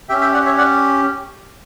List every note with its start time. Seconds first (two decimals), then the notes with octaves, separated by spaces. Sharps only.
0.09 C#4 G4 E5 G5
0.21 E5 G5
0.34 D5 F#5
0.45 C#5 E5
0.58 D5 F#5